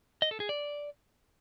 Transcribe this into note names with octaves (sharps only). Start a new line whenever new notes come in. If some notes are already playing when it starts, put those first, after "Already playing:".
D#5
A4
G#4
D5